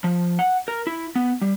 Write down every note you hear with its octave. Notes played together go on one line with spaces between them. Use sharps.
F3
F#5
A#4
E4
B3
G3